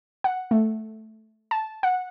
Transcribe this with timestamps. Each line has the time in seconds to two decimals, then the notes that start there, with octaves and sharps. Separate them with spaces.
0.24 F#5
0.51 A3
1.51 A5
1.83 F#5